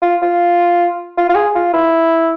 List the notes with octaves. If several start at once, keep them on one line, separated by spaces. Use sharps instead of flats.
F4
F4
F4
F4
G#4
F4
E4